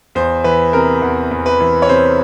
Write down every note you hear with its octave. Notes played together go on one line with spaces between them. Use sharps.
E2 C5
E3 B4
C3 A#4
E2
E2
B4
E3
C#5
C3 C5